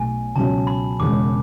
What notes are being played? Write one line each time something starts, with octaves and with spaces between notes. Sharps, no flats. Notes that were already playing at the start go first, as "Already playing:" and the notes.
Already playing: B1 B2 A3 G#5
C#2 B2 F#3 C#4 A5
B5
E1 E2 C#3 G#3 D6